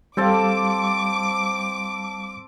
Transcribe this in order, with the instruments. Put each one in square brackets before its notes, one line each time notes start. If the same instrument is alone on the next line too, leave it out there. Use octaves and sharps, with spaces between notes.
[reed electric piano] G3 F5 [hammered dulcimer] C4 A4 A5 [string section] D6